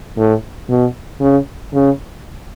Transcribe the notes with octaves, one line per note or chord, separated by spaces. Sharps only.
A2
B2
C#3
C#3